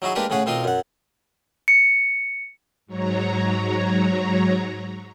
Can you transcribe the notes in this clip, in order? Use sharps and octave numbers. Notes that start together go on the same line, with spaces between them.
F#3 D#4 E4 F#4 G#4
G#3 A#3 D4 G4 A#4 B4
A2 C#3 C#4 G#4 F#5
B1 C4 F4 A#4 D#5
F#2 F#5
C#7
G#2 F#3 C#5 A#5